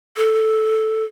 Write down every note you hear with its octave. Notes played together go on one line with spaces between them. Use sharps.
A4